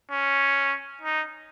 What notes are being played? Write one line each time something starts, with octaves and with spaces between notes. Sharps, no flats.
C#4
D#4